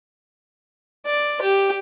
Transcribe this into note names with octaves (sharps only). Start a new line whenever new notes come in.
D5
G4